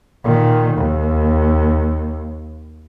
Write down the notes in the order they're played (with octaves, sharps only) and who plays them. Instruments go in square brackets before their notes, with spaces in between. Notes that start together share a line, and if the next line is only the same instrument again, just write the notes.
[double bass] A#2 D#3
D#2